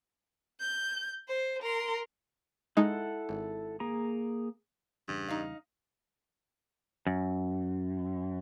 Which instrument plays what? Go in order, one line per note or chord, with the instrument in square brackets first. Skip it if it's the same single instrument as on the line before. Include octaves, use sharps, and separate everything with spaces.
[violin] G6
C5
A#4 C6
[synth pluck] G#3 D#4 [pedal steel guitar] E4 A4 F#5
[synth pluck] G#1
[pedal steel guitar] A#3 G#4 A#5
[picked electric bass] E2 C#3 G3 [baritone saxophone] G2
[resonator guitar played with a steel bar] D#4 F5
[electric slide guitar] F#2